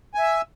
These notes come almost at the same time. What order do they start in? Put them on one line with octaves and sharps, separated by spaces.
G#5 E5 E6